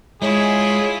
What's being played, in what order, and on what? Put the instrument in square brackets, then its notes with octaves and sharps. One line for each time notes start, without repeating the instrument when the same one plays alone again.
[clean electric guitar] G#3 [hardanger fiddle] E4 F4 [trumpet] G#4 [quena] C#5